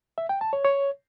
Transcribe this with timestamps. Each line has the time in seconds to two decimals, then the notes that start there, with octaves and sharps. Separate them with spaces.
0.18 E5
0.29 G5
0.41 A5
0.53 C#5
0.65 C#5